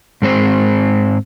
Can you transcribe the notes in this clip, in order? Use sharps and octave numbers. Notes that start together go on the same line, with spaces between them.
G#2 G#3 C4 C5